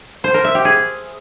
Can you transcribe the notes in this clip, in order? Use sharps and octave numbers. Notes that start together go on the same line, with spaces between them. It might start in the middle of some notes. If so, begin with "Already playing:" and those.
C5
A#4
E5
G4
G#4